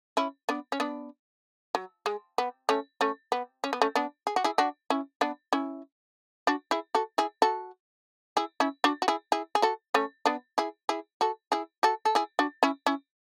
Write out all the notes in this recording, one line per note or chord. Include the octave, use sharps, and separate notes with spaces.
C#4 E4
B3 D4
C#4
B3 D4
F#3
G#3
B3
A3 C#4
A3 C#4
B3
C#4
B3
A3 C#4
B3 D4
G#4
F#4
E4 G#4
D4 F#4
C#4 E4
B3 D4
C#4 E4
D4 F#4
E4 G#4
F#4 A4
E4 G#4
F#4 A4
E4 G#4
C#4 E4
D4 F#4
F#4
E4 G#4
E4 G#4
G#4
F#4 A4
A3 C#4
B3 D4
E4 G#4
E4 G#4
F#4 A4
E4 G#4
F#4 A4
A4
E4 G#4
D4 F#4
C#4 E4
C#4 E4